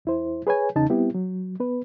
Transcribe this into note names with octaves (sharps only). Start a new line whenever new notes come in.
E2 E4 C5
G#4 B4 C#5 G#5
E2 C#3 D#4 A5
G3 B3 C4 E4 G4
F#3
B3 B4